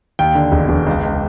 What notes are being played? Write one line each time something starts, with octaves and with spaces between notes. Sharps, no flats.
D#2 G5
D3
E1
E1
C#2
C#2